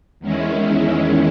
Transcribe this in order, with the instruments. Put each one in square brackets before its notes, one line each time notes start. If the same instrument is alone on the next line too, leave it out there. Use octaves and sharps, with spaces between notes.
[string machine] E2 D#3 G#3 C#4 E4